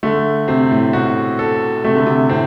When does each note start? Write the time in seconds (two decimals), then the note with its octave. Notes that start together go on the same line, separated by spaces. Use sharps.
0.03 D3 A3
0.48 C3 C4
0.71 A2
0.93 B2 F#4
1.39 A4
1.84 C3 A3
1.96 D3
2.06 C3
2.30 A2 C4